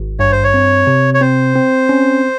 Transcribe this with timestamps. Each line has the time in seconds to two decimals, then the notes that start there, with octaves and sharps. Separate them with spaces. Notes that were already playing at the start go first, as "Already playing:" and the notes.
Already playing: G#1
0.19 G2 C#5
0.32 C5
0.44 C#5
0.54 C4
0.87 C3
1.14 C#5
1.21 C4 C5
1.56 C4
1.89 C#4